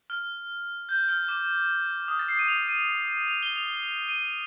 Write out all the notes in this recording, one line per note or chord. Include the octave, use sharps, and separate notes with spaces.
F6
G6
F6
D6
D#6
A6
C7
D#7
F7
D#7
F7
G7
F7
D#7